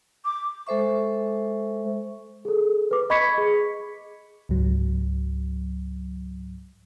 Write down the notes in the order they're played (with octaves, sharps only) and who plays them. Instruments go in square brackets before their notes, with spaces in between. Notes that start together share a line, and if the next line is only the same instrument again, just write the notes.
[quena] D6
[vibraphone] G#3 A4 C5 E5 C#6
[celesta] G#4 A4
B4 D6
D#5 B5 C#6 G#6 B6 C#7
G#4
[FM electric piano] C#2 G#2 F#3